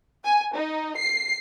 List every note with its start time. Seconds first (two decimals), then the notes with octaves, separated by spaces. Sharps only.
0.24 G#5
0.55 D#4
0.97 C7